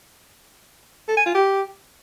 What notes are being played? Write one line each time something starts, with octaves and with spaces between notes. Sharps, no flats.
A4
G#5
F4
G4